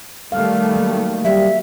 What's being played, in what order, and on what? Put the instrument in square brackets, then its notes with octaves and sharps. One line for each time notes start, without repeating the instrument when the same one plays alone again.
[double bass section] D#3 G3 A3 [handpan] F5
[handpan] F#3 A#3
[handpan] F#3 [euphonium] G3 [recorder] E5